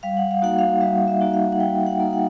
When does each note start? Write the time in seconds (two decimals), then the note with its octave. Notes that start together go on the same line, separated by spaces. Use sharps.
0.03 G3 F5
0.17 F#5
0.31 F5
0.42 A#3 D#4 F#4 F#5
0.59 F5
0.81 G3 E5
1.08 E5
1.21 A#3 D#4 F#4
1.34 F5
1.52 F#5
1.60 G3 G5
1.86 F#5
1.99 A#3 D#4 F#4
2.13 F#5